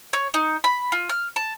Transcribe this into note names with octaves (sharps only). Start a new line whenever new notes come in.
C#5
D#4
B5
F4
F6
A5